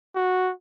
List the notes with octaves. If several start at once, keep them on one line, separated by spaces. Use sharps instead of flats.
F#4